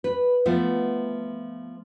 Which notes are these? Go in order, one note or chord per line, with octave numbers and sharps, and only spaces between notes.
B4
F3 A3 B3